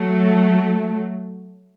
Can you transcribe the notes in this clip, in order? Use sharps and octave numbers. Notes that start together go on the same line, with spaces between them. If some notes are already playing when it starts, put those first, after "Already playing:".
Already playing: F#3 A3